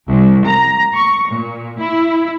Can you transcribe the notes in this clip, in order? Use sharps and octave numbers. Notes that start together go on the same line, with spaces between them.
C2
A#5
C#6
A#2
E4